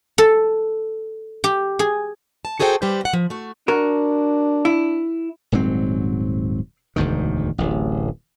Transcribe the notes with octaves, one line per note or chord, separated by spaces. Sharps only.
A4
G4
G#4
A5
F#4 G#4 A4 C5 F5 G5
G3 G4 B4 C5
B2 F#5
F3
A3 F#4
D4 F#4 A#4
E4
D#1 G#2 F#3 C4
E1 D2 G#2 D#3
D1 A1